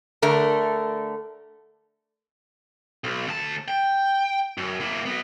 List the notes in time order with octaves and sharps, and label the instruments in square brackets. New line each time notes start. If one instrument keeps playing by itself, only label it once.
[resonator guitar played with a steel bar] D3 A3 A#4
[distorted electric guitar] B1
D2 A5
G5
F#2
A#3 E4
F#3 B3